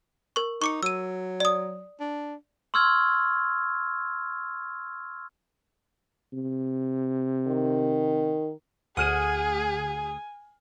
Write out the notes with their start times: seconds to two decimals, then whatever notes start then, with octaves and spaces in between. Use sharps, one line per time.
0.36 A#4 C#6
0.62 D#4 C#6 D6 C#7
0.83 F#3 E6 D#7
1.40 D5 D#6
2.00 D4
2.74 C6 C#6 E6 F6 G#6
6.33 C3
7.47 D#3
8.97 D2 G#4 F#5 G#5 D#6 F6 D#7